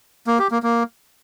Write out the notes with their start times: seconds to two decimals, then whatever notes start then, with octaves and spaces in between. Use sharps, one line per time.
0.27 A#3
0.39 G4
0.51 A#3
0.63 A#3